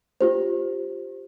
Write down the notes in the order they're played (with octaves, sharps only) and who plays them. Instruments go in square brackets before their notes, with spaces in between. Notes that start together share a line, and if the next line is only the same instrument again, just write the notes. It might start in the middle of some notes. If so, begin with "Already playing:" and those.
[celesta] F4 G4 C5